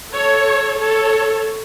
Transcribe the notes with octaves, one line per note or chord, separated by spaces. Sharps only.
A4 C#5
A4 C#5